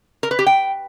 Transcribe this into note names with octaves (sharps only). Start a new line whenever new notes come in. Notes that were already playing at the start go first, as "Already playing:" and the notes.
A#4
B4
G4
G5